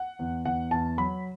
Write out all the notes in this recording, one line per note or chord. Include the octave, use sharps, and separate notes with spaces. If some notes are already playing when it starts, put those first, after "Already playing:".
Already playing: F#5
E2
E2 F#5
E2 A5
F#3 B5